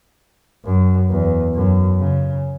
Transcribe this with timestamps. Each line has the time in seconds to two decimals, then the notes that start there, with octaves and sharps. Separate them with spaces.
0.65 F#2
1.10 E2
1.55 F#2
2.00 C#3